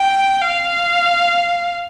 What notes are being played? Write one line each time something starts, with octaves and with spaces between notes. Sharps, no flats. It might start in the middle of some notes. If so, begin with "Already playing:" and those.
Already playing: G5
F5